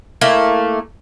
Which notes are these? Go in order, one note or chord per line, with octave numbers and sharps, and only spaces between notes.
A3 A#3 E4